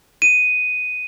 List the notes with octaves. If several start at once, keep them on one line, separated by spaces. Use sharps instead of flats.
D#7